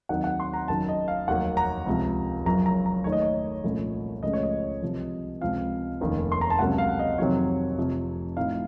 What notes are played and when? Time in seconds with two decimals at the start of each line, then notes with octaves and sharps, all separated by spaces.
0.09 D#2 D#3 F#3 C4 D#4 F#5
0.24 F#5
0.40 C6
0.54 A#5
0.68 F#1 F#2 D#3 F#3 A5
0.89 D#5
1.08 F5
1.28 F1 D#2 D#3 F#3 A#3 F#5
1.57 A#5
1.86 C#2 C3 F3
2.46 F#1 F#2 F3 A#5
2.66 A#5
2.86 A#5
3.04 D#2 D#3 A3 D#4 C#5
3.12 D#5
3.22 C#5
3.64 C2 A#2 F3 A3 C#4
4.23 C#2 C#3 F3 A3 C#4 D#5
4.33 C#5
4.43 D#5
4.82 C2 C3 F3
5.41 C#2 C3 F3 C4 F5
6.00 F1 D#2 D#3 A#3 C#4
6.32 C6
6.41 A#5
6.50 A5
6.59 C#2 C3 F#3 A#3 C#4 F#5
6.78 F5
6.99 D#5
7.18 F2 C3 D#3 F#3 C4 C#5
7.78 F1 F2 C3 F3
8.36 A2 F3 C4 D#4 F5